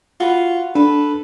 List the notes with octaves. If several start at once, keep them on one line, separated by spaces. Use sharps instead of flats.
F4 F#4 B4
D4 A4 B4